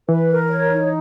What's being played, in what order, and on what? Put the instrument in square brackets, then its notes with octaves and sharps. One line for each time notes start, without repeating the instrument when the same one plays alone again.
[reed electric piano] E3 [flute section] B4
[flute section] A#4
C#5
D#4